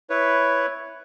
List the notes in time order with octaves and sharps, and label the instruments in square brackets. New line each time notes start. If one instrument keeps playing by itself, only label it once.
[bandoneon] E4 B4 C#5